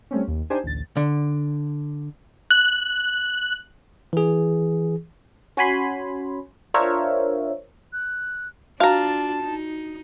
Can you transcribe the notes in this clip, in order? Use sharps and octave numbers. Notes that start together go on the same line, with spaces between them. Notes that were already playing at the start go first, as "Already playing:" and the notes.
G3 A3 C4 C#4
D#2
D4 D#4 G4 C5 G#5
A1 D2 A6
D3
F#6
E3 G#4
C#4 F#4 G#5 B5 C6
D4 F4 A#4 C5 C#5 E5
F#6
D4 F4 F#4 F5 A5 A#5
D#4